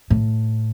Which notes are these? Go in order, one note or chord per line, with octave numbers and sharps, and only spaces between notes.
A2